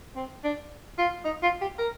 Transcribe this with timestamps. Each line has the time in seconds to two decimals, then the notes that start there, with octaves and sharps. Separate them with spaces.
0.16 C4
0.44 D4
0.98 F4
1.25 D#4
1.43 F4
1.61 G4
1.79 A#4